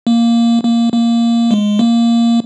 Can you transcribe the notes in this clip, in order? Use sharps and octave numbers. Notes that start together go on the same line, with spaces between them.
A#3
A#3
A#3
G#3
A#3